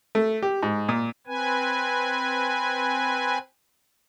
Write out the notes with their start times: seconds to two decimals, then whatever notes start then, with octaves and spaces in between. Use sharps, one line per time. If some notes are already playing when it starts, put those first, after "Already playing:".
0.15 A3
0.42 G4
0.63 G#2
0.89 A#2
1.27 C4 B4 G#5